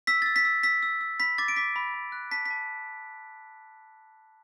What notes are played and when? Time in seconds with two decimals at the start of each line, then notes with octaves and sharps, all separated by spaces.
0.07 E6 B6
0.22 E6 A6
0.36 B6
0.45 E6
0.63 E6 B6
0.83 E6
1.01 E6
1.20 B5 B6
1.38 D6 A6
1.48 D7
1.56 D6 B6
1.76 B5
1.94 B5
2.12 F#6
2.31 A5 B6
2.45 B6
2.50 A5